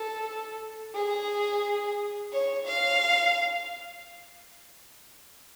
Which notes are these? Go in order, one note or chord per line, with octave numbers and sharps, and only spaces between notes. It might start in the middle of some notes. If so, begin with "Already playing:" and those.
Already playing: A4
G#4
C#5
F5